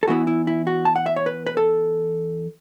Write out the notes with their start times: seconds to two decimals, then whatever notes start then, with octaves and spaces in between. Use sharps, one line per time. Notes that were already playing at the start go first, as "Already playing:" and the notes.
0.03 A4
0.08 E2 E3 B3 E4 F#4
0.27 E4
0.47 E4
0.67 F#4
0.85 A5
0.96 F#5
1.06 E5
1.16 C#5
1.26 B4
1.47 B4
1.57 A4